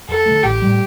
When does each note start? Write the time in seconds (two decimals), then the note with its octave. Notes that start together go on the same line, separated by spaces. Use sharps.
0.09 F2 A4
0.26 D3 A3
0.43 A1 G4
0.62 A2 G3